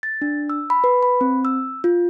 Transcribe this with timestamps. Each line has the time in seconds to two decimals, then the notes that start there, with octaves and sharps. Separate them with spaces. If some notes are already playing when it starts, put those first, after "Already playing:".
0.03 A6
0.22 D4
0.50 E6
0.70 B5
0.84 B4
1.03 B5
1.21 C4
1.45 E6
1.84 F4